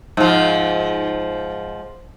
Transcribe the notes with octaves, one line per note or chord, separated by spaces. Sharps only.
G#2 F3